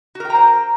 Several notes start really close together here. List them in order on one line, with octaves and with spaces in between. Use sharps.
F#4 A#4 G5 A#5 C5